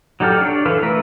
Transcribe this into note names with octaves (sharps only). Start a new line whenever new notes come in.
F#3 D#4 G4 A4 F6
D4 C#5 D5
E3 A4 B4 F5
E3 A3 A#4 B4 E5